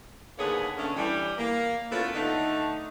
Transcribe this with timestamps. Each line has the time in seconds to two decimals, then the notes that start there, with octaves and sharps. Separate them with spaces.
0.38 D#2 D3 A#3 B3 G#4 C#5
0.78 D3 A3 C#4
0.97 E3 G3
1.38 A#3
1.92 A3 B3 C#4 E4 F4 B4
2.15 D3 A3 D#4